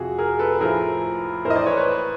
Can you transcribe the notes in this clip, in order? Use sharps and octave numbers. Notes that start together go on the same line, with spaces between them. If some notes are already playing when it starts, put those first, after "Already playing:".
Already playing: F2 C3 F3 F#4 G#4
G#4 A#4
A4 B4
A2 F3 G#4 A#4
A2 E3 A#4 C5 D#5
C5 D5
B4 C#5
B4 C#5